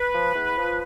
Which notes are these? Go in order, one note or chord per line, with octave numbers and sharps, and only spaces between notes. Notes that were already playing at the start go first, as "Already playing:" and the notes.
Already playing: B4
F3
E2
F3